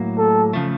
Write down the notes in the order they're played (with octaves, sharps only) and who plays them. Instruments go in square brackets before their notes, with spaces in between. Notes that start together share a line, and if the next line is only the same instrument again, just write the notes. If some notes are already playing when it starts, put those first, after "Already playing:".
Already playing: [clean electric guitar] A2 F#3 A#3
[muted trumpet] A4
[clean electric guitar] C#3 F3 A3